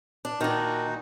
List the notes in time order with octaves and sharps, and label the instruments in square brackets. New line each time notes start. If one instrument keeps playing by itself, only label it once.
[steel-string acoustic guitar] D4
[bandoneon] A#2 D#4 F#4 [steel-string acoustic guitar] D#3 D4